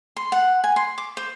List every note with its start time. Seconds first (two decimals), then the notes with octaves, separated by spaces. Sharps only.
0.17 C6
0.32 F#5
0.64 G#5
0.76 C6
0.98 D6
1.17 C5